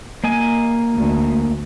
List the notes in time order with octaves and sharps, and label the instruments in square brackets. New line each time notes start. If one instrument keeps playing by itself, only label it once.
[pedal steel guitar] A#3 D#5 G#5
[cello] D2